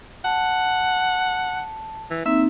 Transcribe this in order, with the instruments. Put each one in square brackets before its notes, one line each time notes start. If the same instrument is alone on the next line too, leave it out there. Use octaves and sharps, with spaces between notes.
[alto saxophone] F#5 [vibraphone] A5
[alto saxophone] E3
[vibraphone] A#3 C4 D#4 [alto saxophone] E5